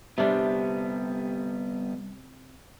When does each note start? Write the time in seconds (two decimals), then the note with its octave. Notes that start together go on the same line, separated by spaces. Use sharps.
0.18 C3 G3 B3 D4